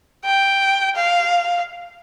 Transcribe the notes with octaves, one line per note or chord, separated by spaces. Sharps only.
G5
F5